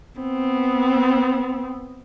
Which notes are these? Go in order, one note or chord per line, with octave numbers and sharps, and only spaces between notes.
B3 C4